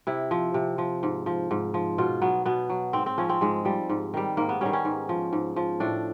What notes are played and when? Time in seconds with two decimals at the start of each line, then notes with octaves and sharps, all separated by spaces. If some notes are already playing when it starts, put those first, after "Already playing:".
0.07 C3 E4
0.31 F3
0.54 C3
0.78 F3
1.03 G#2
1.26 F3
1.51 G#2
1.74 F3
1.98 B2 F4
2.22 F#3 B3
2.46 B2 B3
2.70 F#3
2.93 G#2 C4
3.06 C4
3.18 F3 C#4
3.29 C4
3.41 G#2 G#3
3.65 F3 G3
3.89 G#2
4.14 D#3 G3
4.37 G#2 A#3
4.49 B3
4.61 D#3 G3 C#4
4.73 C#4
4.85 G#2
5.09 F3
5.33 G#2
5.56 F3
5.80 A2 D4